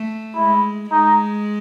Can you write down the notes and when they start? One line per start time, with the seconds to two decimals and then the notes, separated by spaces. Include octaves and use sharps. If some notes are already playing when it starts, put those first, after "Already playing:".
Already playing: A3
0.35 G#3 E4
0.91 G#3 D#4